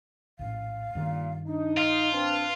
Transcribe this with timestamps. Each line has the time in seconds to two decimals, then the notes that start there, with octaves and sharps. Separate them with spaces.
0.39 A#1 A2 F5
0.95 G2 A#2 D#3
1.47 D4 D#4
1.77 F4 D#5
2.12 C4 D4 B4